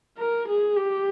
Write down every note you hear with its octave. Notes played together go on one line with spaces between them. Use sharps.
A#4
G#4
G4